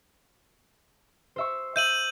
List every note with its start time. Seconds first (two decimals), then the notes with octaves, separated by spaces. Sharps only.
1.36 C5 E5 C#6
1.76 E5 G6 D#7 F#7